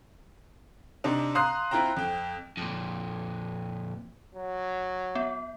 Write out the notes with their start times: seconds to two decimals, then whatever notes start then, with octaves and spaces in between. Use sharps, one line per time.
1.04 C3 D4 D#4
1.35 F5 A#5 C6 D#6 F#6 C7
1.71 C4 E4 F4 G5 A#5
1.97 F2 G5
2.57 F2 A#2
4.35 F#3
5.15 B3